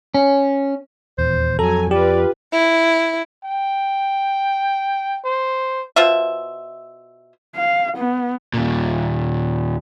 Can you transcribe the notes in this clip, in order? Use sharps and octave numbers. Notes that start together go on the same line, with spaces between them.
C#4
D#1 E2 C5
F2 F#3 A4 G#5 A#5
F4 G4 B4 D5
E4
G5
C5
B2 F4 C5 E5
F5
B3
D#2 A#2